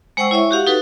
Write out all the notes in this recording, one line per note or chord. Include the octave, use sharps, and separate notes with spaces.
G#3 C5 F#5 G5 C#6 E6
E4 C#5 E5 C#6
F#4 G4 F5 F#5
D#4 F#4 A4 B4